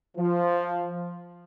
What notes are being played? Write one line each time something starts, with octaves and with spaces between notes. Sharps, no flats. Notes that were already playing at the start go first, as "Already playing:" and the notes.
F3